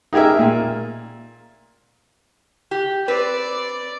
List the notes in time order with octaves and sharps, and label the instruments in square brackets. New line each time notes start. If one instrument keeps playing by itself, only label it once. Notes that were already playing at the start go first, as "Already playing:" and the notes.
[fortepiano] D#4 G4 G#4 A#4 E5
A#2
[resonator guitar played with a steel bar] G4
[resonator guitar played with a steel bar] C4 B4 [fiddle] D5